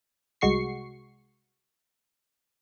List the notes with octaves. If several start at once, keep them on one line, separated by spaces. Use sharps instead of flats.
C2 G#3 F#4 C#6 C7